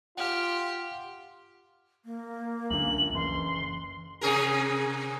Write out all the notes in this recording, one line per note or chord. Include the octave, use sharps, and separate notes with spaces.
F4 G4 F#5 F6
A#3
C#2 F#2 D3 F#7
F#1 E3 C6
C3 G#4 A#4